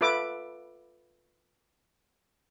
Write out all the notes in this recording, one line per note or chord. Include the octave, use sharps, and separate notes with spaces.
F4 A4 B4 E5 D6